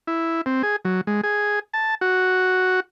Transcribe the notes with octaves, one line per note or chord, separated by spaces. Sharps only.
E4
C4
G#4
F#3
G#3
G#4
A5
F#4